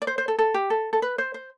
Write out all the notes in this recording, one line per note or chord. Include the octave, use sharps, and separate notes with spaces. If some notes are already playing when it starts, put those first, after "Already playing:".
D5
C5
C5
A4
A4
G4
A4
A4
B4
C5
C5